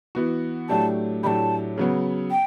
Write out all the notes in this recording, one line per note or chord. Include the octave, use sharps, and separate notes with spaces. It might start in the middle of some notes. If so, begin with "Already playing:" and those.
E3 B3 F#4
A2 F#3 A3 D4 G4 A5
A2 F#3 A3 D4 G4 A5 B5
C#3 F#3 B3
G5